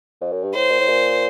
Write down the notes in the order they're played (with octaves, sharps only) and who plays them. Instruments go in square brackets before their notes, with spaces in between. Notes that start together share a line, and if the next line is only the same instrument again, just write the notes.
[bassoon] F2
F#2
G2
[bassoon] A2 [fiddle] C5
[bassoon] A#2
A2
A#2